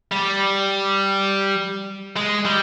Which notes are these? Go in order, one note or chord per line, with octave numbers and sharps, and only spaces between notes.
G3
G#3
G3